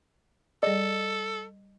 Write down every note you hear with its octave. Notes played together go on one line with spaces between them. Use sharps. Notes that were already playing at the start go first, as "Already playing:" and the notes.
G3 G#4 A4 D5 D#5